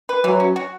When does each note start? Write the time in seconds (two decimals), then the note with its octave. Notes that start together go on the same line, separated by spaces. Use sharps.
0.09 B4
0.24 E3 F#3
0.40 C#4
0.56 F#4